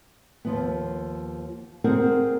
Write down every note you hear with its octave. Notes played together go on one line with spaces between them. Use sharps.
D#2 F3 B3
C4 G#4 A#4 C5 F#5